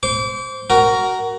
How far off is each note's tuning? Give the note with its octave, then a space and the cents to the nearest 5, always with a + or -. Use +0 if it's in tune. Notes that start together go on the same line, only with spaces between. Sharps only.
C5 +0 D6 -35
F#4 +15 A#4 +0